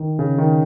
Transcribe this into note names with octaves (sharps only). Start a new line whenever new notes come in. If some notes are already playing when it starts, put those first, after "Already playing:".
Already playing: D#3
C#3
D#3